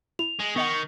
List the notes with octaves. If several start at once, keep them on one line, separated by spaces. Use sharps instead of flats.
E4 F7
G#3
D#3 B3 D#5 F#5 C#6